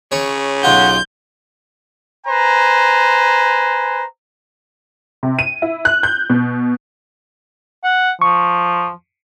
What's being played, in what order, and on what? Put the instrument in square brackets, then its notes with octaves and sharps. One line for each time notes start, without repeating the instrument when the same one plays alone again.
[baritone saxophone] C#3 [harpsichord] C#5
[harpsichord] B1 F4 [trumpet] F#5 [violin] G6
[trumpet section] B4 C5 G#5 A#5
[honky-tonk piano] C3
D#7
E4
F#6
G6
B2
[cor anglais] F#5
[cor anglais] F3 [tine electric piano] C#6